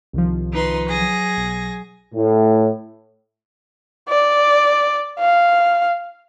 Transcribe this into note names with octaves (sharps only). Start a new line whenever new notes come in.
C2 D#3 F3
D#4 B4 C6
F#3 G#4 A#6
B1
A2
D5
F5